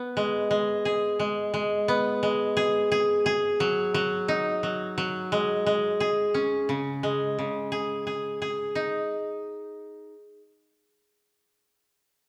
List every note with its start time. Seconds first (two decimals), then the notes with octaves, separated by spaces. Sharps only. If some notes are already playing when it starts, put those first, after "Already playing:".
Already playing: B3
0.17 G#3
0.51 G#3
0.85 G#4
1.19 G#3
1.54 G#3
1.88 B3
2.23 G#3
2.57 G#4
2.92 G#4
3.26 G#4
3.60 F#3
3.94 F#3
4.28 D#4
4.63 F#3
4.98 F#3
5.32 G#3
5.66 G#3
6.00 G#4
6.34 C#4
6.69 C#3
7.03 G#3
7.39 C#3
7.72 G#4
8.07 G#4
8.42 G#4
8.75 D#4